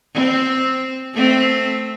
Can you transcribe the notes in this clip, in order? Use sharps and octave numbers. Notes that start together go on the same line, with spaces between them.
C4
A3 C4